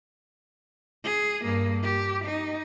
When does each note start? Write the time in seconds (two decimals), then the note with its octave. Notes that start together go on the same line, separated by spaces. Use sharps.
1.04 G#4
1.45 G2 A#3
1.83 G4
2.25 D#4